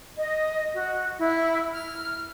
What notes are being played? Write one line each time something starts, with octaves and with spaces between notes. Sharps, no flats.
D#5
F#4
E4
F6